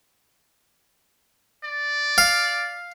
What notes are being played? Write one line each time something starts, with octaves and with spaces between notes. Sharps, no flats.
D5
F5